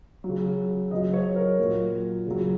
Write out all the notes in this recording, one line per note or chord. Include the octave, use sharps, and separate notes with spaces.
F#3
C#3
C#3 F#3 D#5
C#5
A#4
A#2 F#3
C#3 F#3